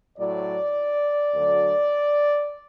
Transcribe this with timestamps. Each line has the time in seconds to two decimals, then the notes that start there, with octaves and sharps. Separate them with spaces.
0.18 A2 F#3 D5
1.33 D2 D3 F#3